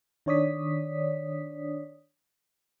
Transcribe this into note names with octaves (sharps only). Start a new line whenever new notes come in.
D#3 D4 C#5 D5 D#6 B6